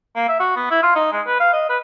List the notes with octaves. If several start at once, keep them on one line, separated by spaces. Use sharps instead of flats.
A#3
E5
F#4
B3
E4
F4
D#4
G#3
B4
F5
D#5
B4